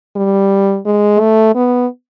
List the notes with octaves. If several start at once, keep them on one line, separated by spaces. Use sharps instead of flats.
G3
G#3
A3
B3